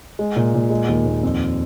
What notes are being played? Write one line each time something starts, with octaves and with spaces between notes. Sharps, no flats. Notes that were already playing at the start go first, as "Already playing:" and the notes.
G#3
A#2
A#2
G#3
D#2
D#2
F2